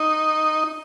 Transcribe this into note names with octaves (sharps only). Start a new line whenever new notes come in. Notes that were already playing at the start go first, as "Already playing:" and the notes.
Already playing: D#4